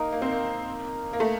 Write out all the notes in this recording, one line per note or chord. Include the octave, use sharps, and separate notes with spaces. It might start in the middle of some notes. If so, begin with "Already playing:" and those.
Already playing: A#3 D#4 A#4
A#3
C4
A#3
A#3
A3